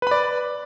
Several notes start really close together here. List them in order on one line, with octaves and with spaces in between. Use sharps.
B4 B5 D5